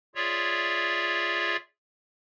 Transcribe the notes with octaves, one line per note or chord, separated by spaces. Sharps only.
F4 G#4 C#5 D5 E5